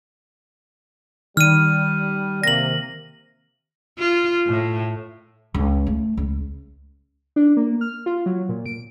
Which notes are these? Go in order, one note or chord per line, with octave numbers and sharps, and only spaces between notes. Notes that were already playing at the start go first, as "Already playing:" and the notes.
D#3 G3 F6 D#7
C3 A#3 A#6 F#7
F4
A2
C#2
A3
C#2
D4
A#3
F6
F4
F#3
A#2
D7